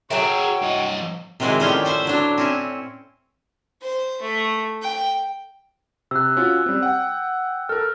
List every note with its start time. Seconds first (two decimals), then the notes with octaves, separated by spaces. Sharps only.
0.11 F#3 G#4 A#4 C#5 E5 G5
0.62 G2 D#5
1.40 C3 D#3 F#3 G#3 E4 F#4
1.60 A2 D#3 G3 C#4 F4 G5
1.85 F4 C5 E5
2.05 D3 F#3 D4
2.38 C4 C#4 E4
3.82 C5
4.22 A3
4.82 G5
6.11 C3 E6 F#6
6.37 C#4 F4 F#4
6.66 G3 C4
6.83 F#5 G5
7.69 A4 A#4 F6